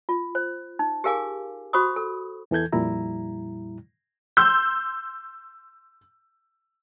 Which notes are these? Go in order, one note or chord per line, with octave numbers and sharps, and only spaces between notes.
F4
C5
D#4
G4 G#4 A#4 F5 G#5 D6
F#4 C5 B5 C#6 D#6
A4
E2 E3 A4 G6 G#6
F2 A#2 G3 E4 A#5
C6 E6 G6